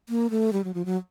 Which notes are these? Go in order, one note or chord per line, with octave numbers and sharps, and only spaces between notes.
A#3
A3
G3
F#3
F3
F#3